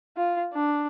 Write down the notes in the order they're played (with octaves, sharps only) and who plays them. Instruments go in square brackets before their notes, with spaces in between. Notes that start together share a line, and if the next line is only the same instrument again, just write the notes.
[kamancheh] F4
D4